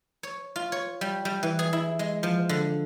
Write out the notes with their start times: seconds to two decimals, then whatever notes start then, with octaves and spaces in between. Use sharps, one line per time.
0.23 C#5
0.56 F4
0.72 C#5
1.01 G3
1.25 G3
1.43 E3
1.59 G#4
1.73 E4
1.99 G#3
2.23 F3
2.49 D3